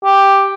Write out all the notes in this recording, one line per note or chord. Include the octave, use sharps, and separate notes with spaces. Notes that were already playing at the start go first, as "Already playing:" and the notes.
G4